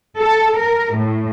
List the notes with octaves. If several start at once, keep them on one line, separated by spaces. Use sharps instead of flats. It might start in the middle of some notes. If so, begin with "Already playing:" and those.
A4
A#4
A2